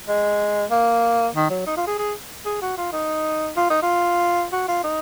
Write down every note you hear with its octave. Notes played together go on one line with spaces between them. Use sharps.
G#3
A#3
D#3
F#3
D#4
F4
G#4
G#4
G#4
F#4
F4
D#4
F4
D#4
F4
F#4
F4
D#4